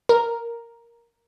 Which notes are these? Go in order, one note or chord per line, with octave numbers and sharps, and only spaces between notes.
A#4